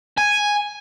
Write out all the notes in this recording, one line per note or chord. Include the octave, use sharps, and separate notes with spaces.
G#5